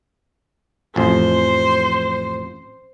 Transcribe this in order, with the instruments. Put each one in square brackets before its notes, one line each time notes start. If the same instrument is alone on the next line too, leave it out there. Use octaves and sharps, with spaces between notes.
[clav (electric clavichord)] A1 F2 [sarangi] C5